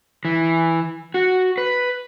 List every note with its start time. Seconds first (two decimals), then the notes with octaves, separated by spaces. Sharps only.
0.25 E3
1.14 F#4
1.58 B4